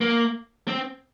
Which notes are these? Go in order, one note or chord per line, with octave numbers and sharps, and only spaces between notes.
A#3
C4